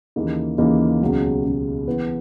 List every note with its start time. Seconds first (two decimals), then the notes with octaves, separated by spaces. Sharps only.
0.16 D#2 C#3 E3 A#3 D#4
0.58 D#2 C#3 E3 A#3 D#4
1.01 C#2 B2 F#3
1.44 C#2 B2 F#3
1.87 E3 B3 E4 B4